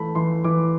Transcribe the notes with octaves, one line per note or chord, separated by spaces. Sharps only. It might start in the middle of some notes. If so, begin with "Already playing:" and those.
Already playing: E3 A3 B5
E3 C6
E3 D6